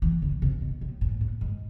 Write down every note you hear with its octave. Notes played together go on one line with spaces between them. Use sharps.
E3
D3
C3
B2
A2
A2
A2
G#2